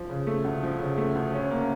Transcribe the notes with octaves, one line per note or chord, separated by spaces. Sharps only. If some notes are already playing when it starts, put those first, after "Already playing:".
Already playing: F3
C#3
A3
D2
F3
C#3
A3
D2
C#4
A#3